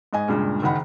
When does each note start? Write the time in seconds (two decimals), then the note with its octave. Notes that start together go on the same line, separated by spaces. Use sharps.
0.13 G#2 D#5 G#5
0.28 C#2 G2 A#2 G#3
0.62 F#1 D#3 D#4 F#5 B5